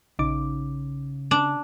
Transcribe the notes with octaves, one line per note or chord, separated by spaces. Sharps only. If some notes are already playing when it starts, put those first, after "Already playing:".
A#1 C#3 D#4 D6
D4 D5